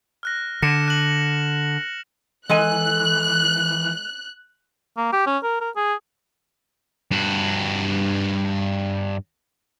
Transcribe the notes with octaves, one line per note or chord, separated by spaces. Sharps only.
F6 F#6 A#6
D3 A#6 C#7 E7
F#6 F#7
E3 G#3 A4 G#5 F#6
A#3
G4
C#4
A#4
A#4
G#4
G2 F#4